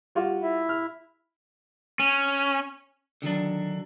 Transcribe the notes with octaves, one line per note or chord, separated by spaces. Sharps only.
G3 F4 F#4
E4 E5
F6
C#4
D3 D#3 F#3 D4